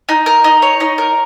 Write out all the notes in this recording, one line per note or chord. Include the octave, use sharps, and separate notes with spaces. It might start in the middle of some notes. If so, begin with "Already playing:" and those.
D#4
A#4
D#4
C#5
D#4
A#4